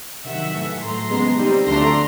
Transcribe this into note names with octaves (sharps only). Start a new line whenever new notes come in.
C3 D#3 F#3 E5 F#5
A2 E3 A3
A2 F#3 A3 A#5 C6
C#3 F3 G#3 B3
A#2 G3 C4 D#4
D2 D3 F3 A3 D4 A#5 C6